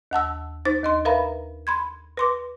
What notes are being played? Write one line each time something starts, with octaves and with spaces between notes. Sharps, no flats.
D#2 F#5 A5 E6
D#4 C5 A6
D#2 D#5 C6
A#4 B4 E5 F5 A#5 B5
B5 C6 G#6
B4 C6 D6